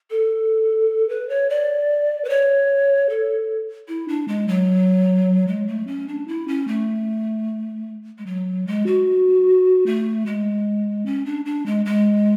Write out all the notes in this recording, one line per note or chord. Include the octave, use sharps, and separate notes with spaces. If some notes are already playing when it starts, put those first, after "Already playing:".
A4
B4
C#5
D5
B4
C#5
A4
E4
D4
G#3
F#3
G#3
A3
C#4
D4
E4
C#4
A3
G#3
F#3
G#3
F#4
A3
G#3
C#4
D4
D4
G#3
G#3